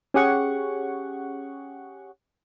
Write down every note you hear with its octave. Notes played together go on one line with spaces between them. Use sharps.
C#4 G4 G#4 F#5 C#6